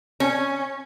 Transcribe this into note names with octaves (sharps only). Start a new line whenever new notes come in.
C#4